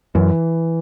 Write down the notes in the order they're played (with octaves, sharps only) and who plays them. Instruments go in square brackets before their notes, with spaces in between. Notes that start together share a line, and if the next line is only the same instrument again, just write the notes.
[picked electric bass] F#2 [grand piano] E3